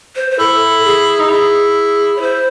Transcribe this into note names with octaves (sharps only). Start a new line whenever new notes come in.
C5
C5
E4 A4
G#4
D#4
E4 G#4
C#5
E4 C5